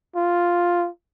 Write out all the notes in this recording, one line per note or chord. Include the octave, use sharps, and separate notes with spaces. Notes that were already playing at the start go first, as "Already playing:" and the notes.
F4